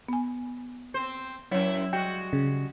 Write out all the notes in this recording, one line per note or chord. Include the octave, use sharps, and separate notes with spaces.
B3 G#5
C4 C5
F#2 F#3 E4 C#5
G3 G#3 F#4 G5
C#3